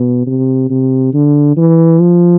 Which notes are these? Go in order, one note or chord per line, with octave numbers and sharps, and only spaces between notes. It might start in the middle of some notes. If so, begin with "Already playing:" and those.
Already playing: B2
C3
C3
D3
E3
F3